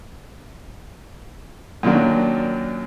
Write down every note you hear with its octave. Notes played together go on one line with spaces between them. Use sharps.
F#2 A#2 D#3 F#3 D4